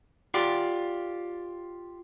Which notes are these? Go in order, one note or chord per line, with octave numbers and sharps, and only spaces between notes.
F4 G4 D5